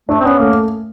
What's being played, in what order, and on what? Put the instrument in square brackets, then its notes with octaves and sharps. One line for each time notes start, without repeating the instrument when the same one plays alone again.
[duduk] A3 [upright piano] D4
[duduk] C4
[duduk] B3 [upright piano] C#4
[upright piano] A3 [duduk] A#3